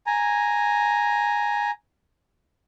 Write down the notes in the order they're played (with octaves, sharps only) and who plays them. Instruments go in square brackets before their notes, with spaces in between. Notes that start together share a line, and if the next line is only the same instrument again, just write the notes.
[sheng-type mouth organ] G#5 A#5